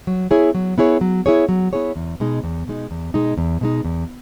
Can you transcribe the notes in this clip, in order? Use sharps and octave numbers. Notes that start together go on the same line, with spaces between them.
F#3
B3 E4 G#4 C#5
F#3
B3 E4 G#4 C#5
F#3
B3 E4 G#4 C#5
F#3
B3 E4 G#4 C#5
E2
B2 G#3 D#4
E2
B2 G#3 D#4
E2
B2 G#3 D#4
E2
B2 G#3 D#4
E2